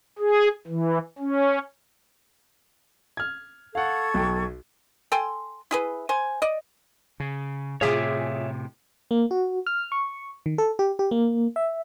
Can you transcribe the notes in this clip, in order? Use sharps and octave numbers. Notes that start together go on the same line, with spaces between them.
G#4
E3
C#4
F6 G#6
A4 F5 F#5 C#6 G#6
B1 G5
A4 G5 G#5 C6
E4 G#4 B4
C5 G#5
D5 D#5
C#3
A2 C3 F4 G#4 C#5 E5 D6
A#3
F#4
F6
C#6
D#3
A4
G4
G4
A#3
E5